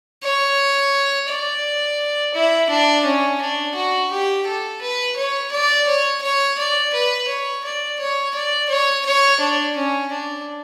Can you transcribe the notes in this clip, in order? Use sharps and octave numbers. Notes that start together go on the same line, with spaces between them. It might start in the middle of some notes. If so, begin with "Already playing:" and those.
C#5
D5
E4
D4
C#4
D4
F#4
G4
A4
B4
C#5
D5
C#5
C#5
D5
B4
C#5
D5
C#5
D5
C#5
C#5
D4
C#4
D4